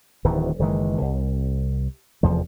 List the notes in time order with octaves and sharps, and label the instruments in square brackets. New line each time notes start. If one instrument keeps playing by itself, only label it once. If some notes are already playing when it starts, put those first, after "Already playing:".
[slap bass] D1 D2 D#3 E3
F#1 D#3 E3 G#3
C2
F1 E2 F3